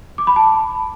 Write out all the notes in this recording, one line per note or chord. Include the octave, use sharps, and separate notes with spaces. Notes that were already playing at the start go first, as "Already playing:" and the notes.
D6
B5
A5